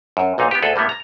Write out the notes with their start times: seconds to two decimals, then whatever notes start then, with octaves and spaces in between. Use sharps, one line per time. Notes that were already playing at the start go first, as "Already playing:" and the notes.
0.17 F#2
0.38 B1 A#2 D#4 F5
0.51 B3 G4
0.62 D2 G#4 A4 B4
0.76 A2 G3 A#3 B3
0.89 A#5